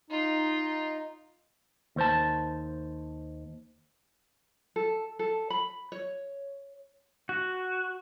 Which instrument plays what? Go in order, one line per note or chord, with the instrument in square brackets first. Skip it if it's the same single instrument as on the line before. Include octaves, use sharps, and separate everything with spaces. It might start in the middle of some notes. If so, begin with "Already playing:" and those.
[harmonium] D#4 [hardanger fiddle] F4
[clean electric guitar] D#2 C5 A5
[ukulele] A4
A4
B5
C#5
[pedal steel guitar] F#4